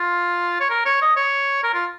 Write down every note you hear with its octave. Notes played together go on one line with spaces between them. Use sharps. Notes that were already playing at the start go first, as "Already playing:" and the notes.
Already playing: F4
C#5
A#4
C#5
D#5
C#5
A#4
F4